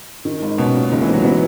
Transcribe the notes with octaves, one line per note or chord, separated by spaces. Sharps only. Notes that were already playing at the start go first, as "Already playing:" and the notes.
D#3
G#1
B2 C#4
A#2
C#2 D#3
E3
B3
F#3
E3 B3